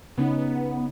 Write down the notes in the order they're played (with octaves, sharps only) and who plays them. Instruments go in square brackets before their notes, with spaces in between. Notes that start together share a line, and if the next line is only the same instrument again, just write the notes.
[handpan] C#3 C#4 D#4 [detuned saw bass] B3